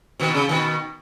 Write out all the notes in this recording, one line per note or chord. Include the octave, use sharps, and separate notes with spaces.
B2 D#3
C#3
B2 D#3